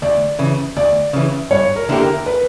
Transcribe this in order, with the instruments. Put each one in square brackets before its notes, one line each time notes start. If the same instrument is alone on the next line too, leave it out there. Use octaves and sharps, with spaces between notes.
[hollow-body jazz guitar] D2 [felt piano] D5
[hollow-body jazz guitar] C#3 E3
[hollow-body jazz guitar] D2 [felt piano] D5
[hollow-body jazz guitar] C#3 E3
[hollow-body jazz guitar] G2 [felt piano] C#5
[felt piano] A#4
[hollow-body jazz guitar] D3 A#3 E4 G4
[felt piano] A#4
B4